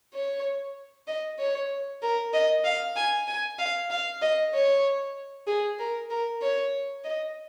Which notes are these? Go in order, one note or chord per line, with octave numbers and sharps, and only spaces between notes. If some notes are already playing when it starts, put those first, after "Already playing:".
C#5
D#5
C#5
A#4
D#5
F5
G#5
G#5
F5
F5
D#5
C#5
G#4
A#4
A#4
C#5
D#5